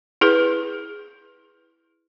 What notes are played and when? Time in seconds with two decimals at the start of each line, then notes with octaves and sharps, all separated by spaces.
0.21 E4 G#4 B4